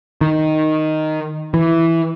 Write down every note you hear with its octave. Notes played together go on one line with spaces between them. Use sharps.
D#3
E3